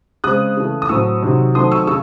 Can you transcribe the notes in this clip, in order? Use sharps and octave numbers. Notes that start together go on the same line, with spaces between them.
C#3 G#3 C4 D#6 F#6
C#3 E3 A3
D#6
A2 F#3 C4 C#6 E6
C3 D#3 F#3
D#3 F#3 A3 C4 C6 D#6
C#6 E6
C#3 C#6 E6